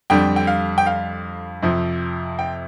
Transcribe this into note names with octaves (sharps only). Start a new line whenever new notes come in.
F2 D3 G3 G5
G5
F5
G5
F5
F2 C3 F3
G5